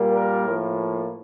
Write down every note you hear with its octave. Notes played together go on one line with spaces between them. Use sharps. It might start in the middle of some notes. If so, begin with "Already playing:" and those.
Already playing: A#2 G3 A#3
A#4
A2 F3 A#3